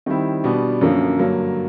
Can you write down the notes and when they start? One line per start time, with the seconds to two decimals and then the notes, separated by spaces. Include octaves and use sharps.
0.06 D#3 G3 C4 E4
0.44 B2 G3 B3 D4
0.81 F#2 D3 F3 A#3
1.19 G2 D3 F#3 A#3